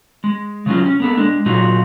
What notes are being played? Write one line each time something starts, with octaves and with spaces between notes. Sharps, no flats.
G#3
C#3 F#3 C#4 F4
C#4
A#3 B3 A4
G#3 D4
A#2 F#3 D#4 F4 F#4